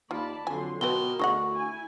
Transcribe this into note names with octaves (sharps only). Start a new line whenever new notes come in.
D#2 F4 D5 A5 B5
F2 D3 F#3 G#5 C6
B2 F3 C4 A#4 B4 G7
D2 G#4 D#5 F#5 C#6
E4 G#5